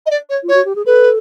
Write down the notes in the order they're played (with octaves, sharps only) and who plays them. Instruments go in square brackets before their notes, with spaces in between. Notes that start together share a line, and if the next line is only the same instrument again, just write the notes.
[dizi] D#5
D5
C#5
[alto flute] F4
[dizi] C#5
[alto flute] F#4
G4
G#4
[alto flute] A4 [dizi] B4